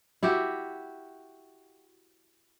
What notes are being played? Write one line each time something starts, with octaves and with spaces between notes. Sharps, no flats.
E4 F#4 G4 E5